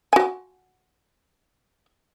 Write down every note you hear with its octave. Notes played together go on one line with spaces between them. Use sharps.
F#4 G#5